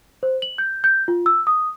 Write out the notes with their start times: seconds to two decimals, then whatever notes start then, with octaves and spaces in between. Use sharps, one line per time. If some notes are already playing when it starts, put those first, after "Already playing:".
0.23 C5
0.42 F#7
0.58 G6
0.84 G6
1.08 F4
1.26 E6
1.47 D#6